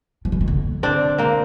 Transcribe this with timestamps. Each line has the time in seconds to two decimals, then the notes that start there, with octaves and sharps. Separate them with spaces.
0.25 F3
0.32 E3
0.41 D#3
0.48 D3
0.83 C4 D4
1.18 A#3 C4